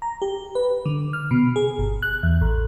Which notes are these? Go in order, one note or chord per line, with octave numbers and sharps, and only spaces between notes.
A#5
G4
B4
D3
F6
B2
G#4
G1
F#6
E2
A1